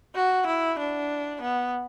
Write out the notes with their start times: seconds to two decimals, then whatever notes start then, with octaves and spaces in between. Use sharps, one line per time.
0.15 F#4
0.47 E4
0.79 D4
1.42 B3